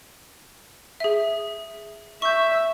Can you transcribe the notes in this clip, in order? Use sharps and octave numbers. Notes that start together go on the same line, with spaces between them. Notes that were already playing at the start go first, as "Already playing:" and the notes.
G#4 E5
E5 C#6 G6